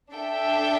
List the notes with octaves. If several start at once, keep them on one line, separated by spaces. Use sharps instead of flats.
D4 A4 E5 G5